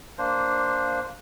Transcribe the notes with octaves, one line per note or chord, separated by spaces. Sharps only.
A#3 D4 C5